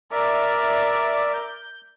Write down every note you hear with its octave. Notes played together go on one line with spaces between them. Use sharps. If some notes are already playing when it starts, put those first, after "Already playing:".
A#4 D5 E5 D6
G6